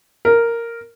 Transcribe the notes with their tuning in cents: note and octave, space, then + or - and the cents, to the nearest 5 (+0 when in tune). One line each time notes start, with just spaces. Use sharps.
A#4 -5